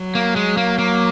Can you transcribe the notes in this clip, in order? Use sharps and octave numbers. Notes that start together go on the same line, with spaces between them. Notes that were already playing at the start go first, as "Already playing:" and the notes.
Already playing: F#3
A#3
G#3
A#3
A#3